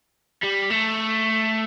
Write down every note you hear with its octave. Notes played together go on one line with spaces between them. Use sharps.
G3
A3